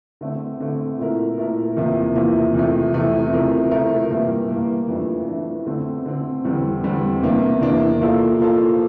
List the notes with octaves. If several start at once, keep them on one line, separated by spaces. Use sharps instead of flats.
D3 A3 C4
D3 A3 C4
A#2 A3 E4 A#4
A#2 A3 E4 A#4
E2 C3 F3 A#3 E4
E2 C3 F3 A#3 E4
E2 C3 F3 A3
E2 C3 F3 A3
C3 F3 A3 E4 A#4
C3 F3 A3 E4 A#4
G2 E3 A#3
G2 E3 A#3
F2 E3 A3 D4
F2 E3 A3 D4
D3 A3 C4
D3 A3 C4
E2 D3 G3 C4
E2 D3 G3 C4
E2 C3 E3 A#3 D4
E2 C3 E3 A#3 D4
F3 A#3 F4 A4
F3 A#3 F4 A4